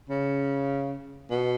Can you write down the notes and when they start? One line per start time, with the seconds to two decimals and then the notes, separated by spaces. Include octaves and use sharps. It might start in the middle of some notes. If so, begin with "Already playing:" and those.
0.10 C#3
1.31 B2